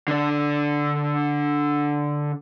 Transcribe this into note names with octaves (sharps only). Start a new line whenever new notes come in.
D3 D4